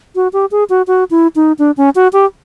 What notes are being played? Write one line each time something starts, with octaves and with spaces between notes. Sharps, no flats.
F#4
G4
G#4
F#4
F#4
E4
D#4
D4
C#4
F#4
G4